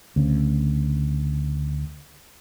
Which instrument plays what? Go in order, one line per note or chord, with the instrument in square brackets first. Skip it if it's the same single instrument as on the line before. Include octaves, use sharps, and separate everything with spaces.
[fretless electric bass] D2 C#3